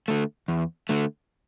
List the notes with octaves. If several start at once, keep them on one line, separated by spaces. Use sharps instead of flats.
D3 A3
E2
D3 A3